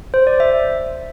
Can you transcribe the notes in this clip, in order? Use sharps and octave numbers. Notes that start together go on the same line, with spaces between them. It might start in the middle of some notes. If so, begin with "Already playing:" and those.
C5
D5
E5